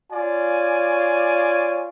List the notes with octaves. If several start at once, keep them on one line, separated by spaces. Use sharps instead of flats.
F4 C#5 D5 G#5